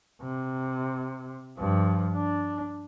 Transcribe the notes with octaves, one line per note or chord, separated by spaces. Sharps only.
C3
G2 F3
D4